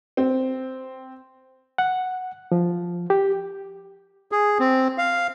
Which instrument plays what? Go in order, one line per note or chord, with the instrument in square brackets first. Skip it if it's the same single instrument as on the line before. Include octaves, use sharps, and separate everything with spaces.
[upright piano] C4
[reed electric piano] F#5
F3
G4
[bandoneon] G#4
C4
F5